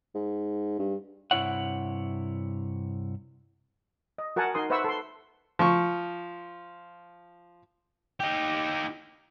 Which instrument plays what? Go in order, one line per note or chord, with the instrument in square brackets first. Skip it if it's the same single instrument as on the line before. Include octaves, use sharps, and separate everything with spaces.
[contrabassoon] G#2
G2
[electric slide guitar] G2 C3 E4 C#5 F#5
[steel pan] D#5
F#4 A#4 F#5 G#5 A5
D#4 A#4 C6 D#6
B4 C5 E5 F#5 C#6 E6
A4 C6
[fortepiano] F3 C#6
[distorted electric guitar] D#4 G4